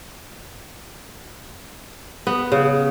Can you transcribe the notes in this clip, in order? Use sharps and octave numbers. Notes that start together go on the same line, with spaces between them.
B3
C#3